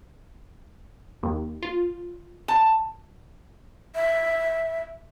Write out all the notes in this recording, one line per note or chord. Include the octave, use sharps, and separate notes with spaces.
D#2
F4
A5
E5